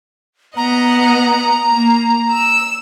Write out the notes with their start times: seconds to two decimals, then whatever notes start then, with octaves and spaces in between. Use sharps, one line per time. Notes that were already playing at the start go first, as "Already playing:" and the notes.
0.57 B3 D#5 F#5 A#5
1.68 A#3
2.29 E6